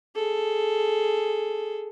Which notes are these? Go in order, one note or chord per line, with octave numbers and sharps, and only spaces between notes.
G#4 A4